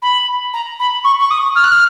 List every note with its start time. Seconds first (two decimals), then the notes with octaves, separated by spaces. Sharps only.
0.02 B5
0.53 A#5
0.79 B5
1.04 C#6
1.20 C#6
1.30 D#6
1.55 F6
1.63 F#6
1.72 F6